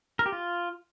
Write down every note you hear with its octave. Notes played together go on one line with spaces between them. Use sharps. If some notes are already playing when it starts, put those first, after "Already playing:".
A#4
G4
F4